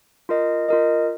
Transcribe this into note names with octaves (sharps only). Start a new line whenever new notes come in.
F4 A#4 D#5
F4 A#4 D#5